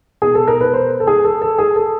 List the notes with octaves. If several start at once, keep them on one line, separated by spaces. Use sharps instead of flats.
B2 G#4
A4
A#4
B4
C5
A4
G#4
A4
A4
G#4
A4